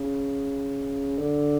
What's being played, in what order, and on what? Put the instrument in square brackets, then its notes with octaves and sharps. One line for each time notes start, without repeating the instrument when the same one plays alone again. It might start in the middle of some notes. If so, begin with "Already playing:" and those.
Already playing: [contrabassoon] C#3
D3